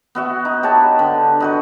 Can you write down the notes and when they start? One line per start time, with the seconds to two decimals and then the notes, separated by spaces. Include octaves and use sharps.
0.15 B3 F#4 E5
0.45 D#4
0.63 G4 B4 C#5 A5
0.99 D3
1.40 D#4 F#4 B4